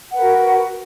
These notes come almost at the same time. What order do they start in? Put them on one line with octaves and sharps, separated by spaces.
F#5 B4 A#4 F#4